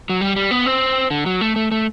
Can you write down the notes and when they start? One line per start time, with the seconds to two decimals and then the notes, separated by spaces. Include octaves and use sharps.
0.10 F#3
0.21 G3
0.36 G3
0.51 B3
0.66 C4
1.10 D3
1.26 F#3
1.41 A3
1.56 A3
1.71 A3